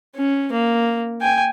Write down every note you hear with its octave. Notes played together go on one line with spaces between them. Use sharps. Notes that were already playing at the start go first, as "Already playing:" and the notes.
C#4
A#3
G5 G#5